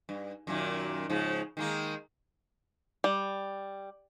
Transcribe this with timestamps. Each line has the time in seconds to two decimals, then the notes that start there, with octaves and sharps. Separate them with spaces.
0.09 G2
0.47 F#2 A#2 D#3
1.10 G#2 C#3 F3
1.57 D#3 G#3 A#3
3.04 G3